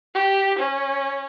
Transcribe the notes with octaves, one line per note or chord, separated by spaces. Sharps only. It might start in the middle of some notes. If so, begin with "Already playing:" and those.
G4
C#4